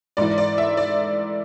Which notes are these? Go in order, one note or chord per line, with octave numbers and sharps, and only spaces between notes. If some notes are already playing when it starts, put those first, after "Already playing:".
G#2 E3 D5
D5
E5
D5